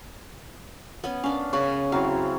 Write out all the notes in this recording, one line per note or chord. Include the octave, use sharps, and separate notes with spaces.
B3 C#4
C#4 D4 F5
C#3 B4 C#5
F#3 C4 E4 F5